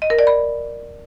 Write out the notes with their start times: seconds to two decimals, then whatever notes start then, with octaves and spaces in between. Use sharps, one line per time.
0.02 D#5
0.10 A#4
0.19 D5
0.27 B5